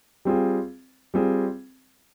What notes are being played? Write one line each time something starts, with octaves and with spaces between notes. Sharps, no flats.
G3 C4 F4 G#4
G3 C4 F4 G#4